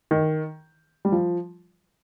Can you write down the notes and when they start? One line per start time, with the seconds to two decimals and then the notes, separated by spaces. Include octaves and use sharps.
0.11 D#3
1.05 G3
1.12 F3